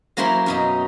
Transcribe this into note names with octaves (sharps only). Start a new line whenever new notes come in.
F#3 A#3 C#4 E4 C5 C6
F#2 B2 D#4